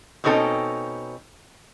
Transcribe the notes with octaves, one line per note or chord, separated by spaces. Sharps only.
B2 C4 C#4 D#4 A4 G5